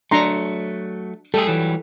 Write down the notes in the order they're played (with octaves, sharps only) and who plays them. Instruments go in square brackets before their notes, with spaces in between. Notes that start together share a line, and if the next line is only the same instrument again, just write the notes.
[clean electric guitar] F#3 A3 [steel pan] D4 A#5 C6
[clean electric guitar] G3 A3 G#4 [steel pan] A4
[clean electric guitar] E3 F#3 G3